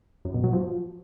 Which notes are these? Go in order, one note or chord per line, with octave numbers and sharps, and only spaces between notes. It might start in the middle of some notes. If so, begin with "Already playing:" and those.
F#2
B2
F#3
F3